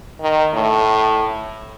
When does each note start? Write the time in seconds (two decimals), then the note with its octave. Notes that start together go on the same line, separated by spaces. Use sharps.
0.21 D#3
0.54 A2